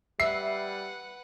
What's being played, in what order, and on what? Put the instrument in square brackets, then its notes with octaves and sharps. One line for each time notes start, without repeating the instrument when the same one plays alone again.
[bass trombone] G3 [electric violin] B4 F#5 [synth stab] E5 [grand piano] C7